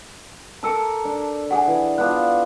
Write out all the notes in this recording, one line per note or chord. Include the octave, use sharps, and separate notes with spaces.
A4 A#4 A5 D6 E6 C#7
D4
G#4 D5 F#5 G#5
E3
B3 D4 F4 F#6